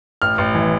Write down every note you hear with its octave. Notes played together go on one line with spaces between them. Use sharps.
A1 F6
A1
E3